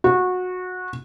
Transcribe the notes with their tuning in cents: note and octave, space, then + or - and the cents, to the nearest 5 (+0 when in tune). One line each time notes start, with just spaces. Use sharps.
F#4 -20